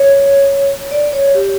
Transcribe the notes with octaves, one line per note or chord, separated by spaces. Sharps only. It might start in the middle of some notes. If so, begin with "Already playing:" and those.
Already playing: C#5
D5
C#5
G4